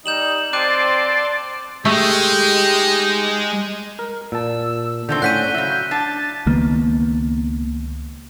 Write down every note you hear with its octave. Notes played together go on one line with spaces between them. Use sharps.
G3 D#4 G6 E7 F#7
C4 D5 A5 C6 D6 F#6 D#7
G#3 A3 D#4 G4
A#4
A#2 A5 E6
D3 D#3 A3 C4 G6
A2 C#4 D5 F#5 G5 F#6 B6 D#7
C#3 F#3 E5
D4 A5 A6
C#2 D#3 A#3 B3